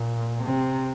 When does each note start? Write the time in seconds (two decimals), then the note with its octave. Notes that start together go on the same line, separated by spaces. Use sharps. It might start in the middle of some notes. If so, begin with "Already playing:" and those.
Already playing: A#2
0.44 C3